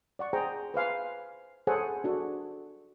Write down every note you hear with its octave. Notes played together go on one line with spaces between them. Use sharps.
D5 F#5 C#6
G#4 C5 G5 A#5
B4 C5 F5 G#5
G#4 A4 C5 C#5 F#5 G#5
D4 F#4 A4